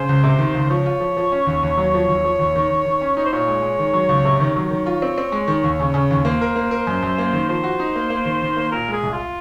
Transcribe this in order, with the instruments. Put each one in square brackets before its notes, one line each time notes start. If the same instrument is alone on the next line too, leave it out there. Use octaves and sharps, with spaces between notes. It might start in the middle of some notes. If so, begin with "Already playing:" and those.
Already playing: [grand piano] C#3 [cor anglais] C5
[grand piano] C#2
C3
D#3
C#2
[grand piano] F3 [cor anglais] C#5
[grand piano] F4
F3
F3
C#4
D#2
D#2
F#3
F3
D#2
F3
D#2
D#3
D#3
D#3
C#4
[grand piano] D#4 [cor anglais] C#5
[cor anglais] C5
[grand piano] A#2 [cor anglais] C#5
[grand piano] G#3
G#3
D#3
F#3
C#2
C3
[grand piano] D#3 [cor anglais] C#5
[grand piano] F#3
[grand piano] D#3 [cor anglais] C#5
[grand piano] F4
C4
C4
G#3
D#3
D#2
C#3
C#3
D#2
[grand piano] A#3 [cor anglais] C5
[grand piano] A#4
A#3
A#4
F#2
F#2
A#3
D#3
[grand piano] F3 [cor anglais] C5
[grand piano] F#4
D#4
A#3
A#3
D#3
D#3
A#3
[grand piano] A#2 [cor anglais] A#4
[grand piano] G#3 [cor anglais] G#4
[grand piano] C2
[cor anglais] F4